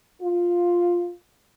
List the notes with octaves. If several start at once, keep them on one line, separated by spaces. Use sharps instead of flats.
F4